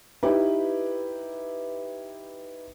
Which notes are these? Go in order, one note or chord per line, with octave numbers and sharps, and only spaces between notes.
D#4 E4 G4 B4